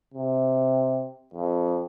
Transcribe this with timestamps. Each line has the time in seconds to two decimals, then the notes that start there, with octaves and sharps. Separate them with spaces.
0.14 C3
1.34 F2